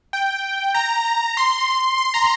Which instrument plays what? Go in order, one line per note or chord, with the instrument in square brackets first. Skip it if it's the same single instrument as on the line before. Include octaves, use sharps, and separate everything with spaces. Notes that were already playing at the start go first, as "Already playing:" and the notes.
[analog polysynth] G5
A#5
C6
C6
A#5